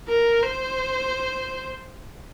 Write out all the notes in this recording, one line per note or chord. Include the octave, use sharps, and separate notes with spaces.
A#4
C5